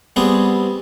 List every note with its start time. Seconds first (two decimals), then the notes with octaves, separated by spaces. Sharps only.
0.16 G3 B3 C4 G#4